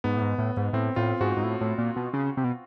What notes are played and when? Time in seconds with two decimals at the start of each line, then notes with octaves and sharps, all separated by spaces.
0.04 G#2 B3
0.17 A2
0.22 G#2
0.38 A2
0.57 G#2
0.73 A2 C4
0.96 A2 F4
1.21 G#2 F#4
1.37 G#2
1.43 A2
1.61 A2
1.78 A#2
1.96 B2
2.13 C#3
2.37 C3
2.44 B2